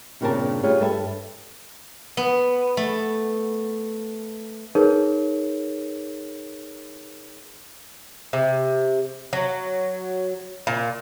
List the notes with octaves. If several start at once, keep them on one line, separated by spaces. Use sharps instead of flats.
G2 A#2 C#3 C4 A#4 A5
G3 A3 D4 F4 G#4 C#5
G2 G3 A4 B4 E5 A5
B3
A3
D#4 G#4 A#4 B4 C#5
C3
F#3
A#2